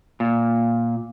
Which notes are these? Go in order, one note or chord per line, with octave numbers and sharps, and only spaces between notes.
A#2